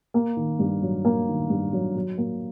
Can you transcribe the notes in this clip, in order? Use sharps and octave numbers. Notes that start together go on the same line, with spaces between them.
A#3
D#3
G2
F#3
A#3
D#3
G2
F#3
F#3
A#3